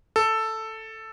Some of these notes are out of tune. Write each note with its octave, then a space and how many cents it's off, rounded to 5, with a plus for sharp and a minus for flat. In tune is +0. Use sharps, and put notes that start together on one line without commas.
A4 +5